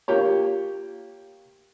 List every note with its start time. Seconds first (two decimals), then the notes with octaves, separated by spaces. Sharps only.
0.08 A#3 F4 G4 C#5